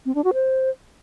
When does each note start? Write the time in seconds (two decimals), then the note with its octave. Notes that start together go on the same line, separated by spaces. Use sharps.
0.06 C4
0.15 D4
0.24 F#4
0.34 C5